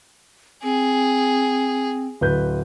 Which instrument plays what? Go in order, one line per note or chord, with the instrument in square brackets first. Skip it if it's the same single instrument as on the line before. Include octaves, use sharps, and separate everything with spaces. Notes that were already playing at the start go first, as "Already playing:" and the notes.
[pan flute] C4 [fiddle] G#4
[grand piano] D1 B4 G6